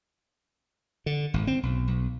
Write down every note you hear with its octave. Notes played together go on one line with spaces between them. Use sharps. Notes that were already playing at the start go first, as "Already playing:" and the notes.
D3
G#1
C4
B1
B1